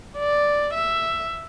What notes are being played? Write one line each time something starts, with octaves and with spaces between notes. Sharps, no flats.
D5
E5